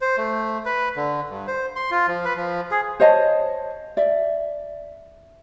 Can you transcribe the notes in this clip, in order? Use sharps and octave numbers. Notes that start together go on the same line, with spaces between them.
C5
A3
B4
D3
G2
C5
C6
F4
F3
B4
F3
G#4
C5 C#5 D#5 A5
D5 E5